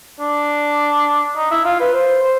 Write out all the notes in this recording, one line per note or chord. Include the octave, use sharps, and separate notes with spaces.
D4
D#4
E4
F4
B4
C5
C5